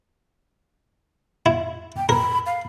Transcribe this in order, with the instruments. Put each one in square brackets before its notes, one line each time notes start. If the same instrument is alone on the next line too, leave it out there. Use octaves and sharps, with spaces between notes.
[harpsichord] E4
[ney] G5
[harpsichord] A#4 [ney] B5
[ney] F5